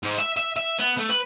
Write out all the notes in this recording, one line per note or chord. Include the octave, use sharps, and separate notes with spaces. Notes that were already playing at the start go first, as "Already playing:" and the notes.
G#2
E5
E5
E5
B3
A3
B4